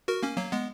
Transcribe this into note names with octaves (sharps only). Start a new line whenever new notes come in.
F#4 A#4
A#3 C#4
F#3 A#3
G#3 B3